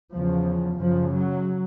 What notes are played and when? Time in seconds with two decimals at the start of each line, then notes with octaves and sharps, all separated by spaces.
0.14 E2 C#3 F3
0.80 F#2 C#3 F3
1.12 F#3